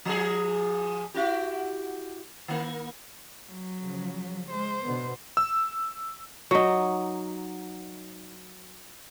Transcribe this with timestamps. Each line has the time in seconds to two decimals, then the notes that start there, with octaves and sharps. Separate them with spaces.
0.05 F3 G#4
1.14 E4 F#4 G4
2.48 D#3 A#3
3.50 F#3
3.82 C#3 F3
4.50 G#3 C5
4.83 B2 D3 B3
5.37 E6
6.51 F#3 D#4